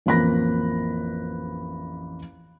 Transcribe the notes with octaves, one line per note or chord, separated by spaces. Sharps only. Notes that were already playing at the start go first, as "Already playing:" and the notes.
A1 F2 A#3 B5 F#6 A#6